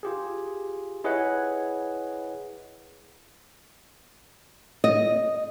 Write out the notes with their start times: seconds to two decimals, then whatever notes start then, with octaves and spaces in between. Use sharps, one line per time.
0.03 F4 G4 G#4
1.04 E4 G#4 B4 C#5 D#5 F#5
4.84 D#5